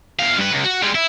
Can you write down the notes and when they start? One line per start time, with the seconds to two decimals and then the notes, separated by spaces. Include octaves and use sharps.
0.19 E2 F5
0.38 G2 B4
0.51 C#2
0.64 F#4
0.82 G3 G#3
0.95 E4